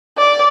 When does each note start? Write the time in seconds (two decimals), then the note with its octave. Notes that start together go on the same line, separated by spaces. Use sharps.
0.17 D5